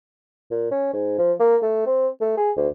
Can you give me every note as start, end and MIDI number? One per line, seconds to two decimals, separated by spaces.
0.51 0.71 46
0.71 0.91 61
0.93 1.17 44
1.18 1.33 53
1.40 1.57 58
1.62 1.86 57
1.86 2.08 60
2.21 2.34 57
2.37 2.51 68
2.57 2.68 38